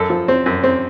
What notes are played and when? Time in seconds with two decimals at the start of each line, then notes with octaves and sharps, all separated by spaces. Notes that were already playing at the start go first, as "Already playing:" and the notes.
Already playing: F#2 A4
0.10 F3
0.28 C4
0.46 F#2
0.63 C4